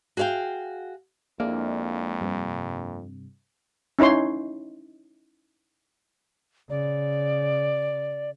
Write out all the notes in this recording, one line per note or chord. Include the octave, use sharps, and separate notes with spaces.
F#4 G#4 C#5 F5 G5
F2 G#3 A#3 D4 E4
G2 C3
C#4 D#4 E4 C#5 C6
C#3 D5